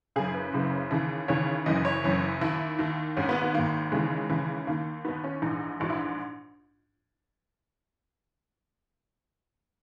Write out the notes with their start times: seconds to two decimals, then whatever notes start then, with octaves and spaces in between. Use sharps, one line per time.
0.16 F#1 F#2 C#3 G#4
0.34 B4
0.53 F#1 F#2 C#3
0.91 D#2 C#3 E3
1.28 D#2 C#3 E3 C#5
1.66 F#1 F#2 E3 D#5
1.85 C#5
2.04 F#1 F#2 E3
2.41 D#2 D#3 E4
2.79 D#2 D#3
3.17 G#1 G#2 D#3 C#4
3.29 B3
3.42 B3
3.54 G#1 G#2 D#3 A#3
3.92 D#2 C#3 E3 G#3
4.30 D#2 C#3 E3
4.67 D#2 D#3 A#3
5.04 D#2 D#3 B3
5.24 C#4
5.42 A#1 G#2 E3 D#4
5.80 A#1 G#2 E3 F#4
5.90 E4